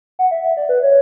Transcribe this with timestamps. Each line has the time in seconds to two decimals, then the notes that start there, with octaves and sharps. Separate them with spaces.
0.19 F#5
0.31 E5
0.44 E5
0.57 D5
0.69 B4
0.83 C#5